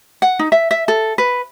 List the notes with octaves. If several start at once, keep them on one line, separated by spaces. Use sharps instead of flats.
F#5
D#4
E5
E5
A4
B4